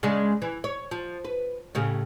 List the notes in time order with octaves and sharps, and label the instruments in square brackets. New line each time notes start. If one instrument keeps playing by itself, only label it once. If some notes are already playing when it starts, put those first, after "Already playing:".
[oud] C#3 G#3 D4
E3
C#5
F3
B4
A2 C#3 G4